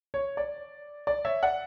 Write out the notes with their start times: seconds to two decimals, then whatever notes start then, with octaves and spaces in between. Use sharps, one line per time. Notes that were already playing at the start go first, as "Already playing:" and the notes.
0.14 C#5
0.37 D5
1.07 D5
1.25 C#5 E5
1.43 D5 F#5